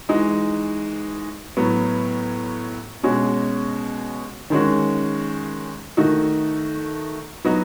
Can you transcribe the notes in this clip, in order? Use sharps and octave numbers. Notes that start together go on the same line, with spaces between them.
E3 G#3 D#4 F#4
A2 F#3 B3
B2 G#3 C#4 F#4
D#3 G#3 C#4 F#4
D#3 A3 D#4 F#4
F#3 B3 D#4 F#4